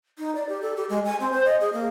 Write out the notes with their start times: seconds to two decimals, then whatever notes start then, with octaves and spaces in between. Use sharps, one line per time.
0.18 D#4
0.35 D5
0.49 G4
0.62 A4
0.77 G4
0.89 G#3
1.05 G#5
1.20 C4
1.32 C5
1.46 D#5
1.61 G#4
1.73 A#3